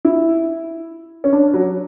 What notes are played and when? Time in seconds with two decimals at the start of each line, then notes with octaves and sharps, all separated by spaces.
0.05 E4
1.24 C#4
1.33 D4
1.54 F#3